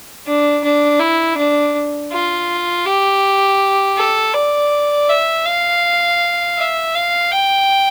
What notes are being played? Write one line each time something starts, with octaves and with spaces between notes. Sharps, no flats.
D4
D4
E4
D4
F4
G4
A4
D5
E5
F5
E5
F5
G5